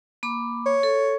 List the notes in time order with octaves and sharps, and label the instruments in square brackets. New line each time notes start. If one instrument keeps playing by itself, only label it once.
[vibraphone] A#3 B5 D6
[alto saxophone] C#5
[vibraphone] A4